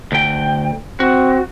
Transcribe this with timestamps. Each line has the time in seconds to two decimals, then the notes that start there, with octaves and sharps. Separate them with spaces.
0.12 D2 G5
1.00 C4 F#4